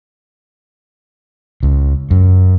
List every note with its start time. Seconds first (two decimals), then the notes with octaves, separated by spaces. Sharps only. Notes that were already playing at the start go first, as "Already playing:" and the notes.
1.63 C#2
2.11 F#2